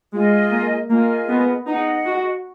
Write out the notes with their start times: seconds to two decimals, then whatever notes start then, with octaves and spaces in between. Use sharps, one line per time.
0.12 G#3 F4 G#4 D#5 G#5
0.52 A#3
0.90 A#3 F4 G#4 D#5 G#5
1.28 B3
1.67 D#4 G#4 D#5 F#5
2.06 F#4